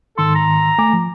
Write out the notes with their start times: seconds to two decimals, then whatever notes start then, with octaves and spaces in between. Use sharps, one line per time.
0.18 G#2 D#3 A4 C6
0.35 A#5
0.78 A3 G#5 D6
0.93 F3